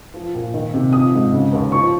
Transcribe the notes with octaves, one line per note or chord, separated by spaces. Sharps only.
F3
A#2
D#3
C3
F3 D#6
G#2
C#3
D#2
F3 C#6